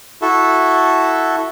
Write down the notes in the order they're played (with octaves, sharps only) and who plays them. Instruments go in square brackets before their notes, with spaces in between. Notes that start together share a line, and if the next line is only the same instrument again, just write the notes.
[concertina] E4 F#4 A4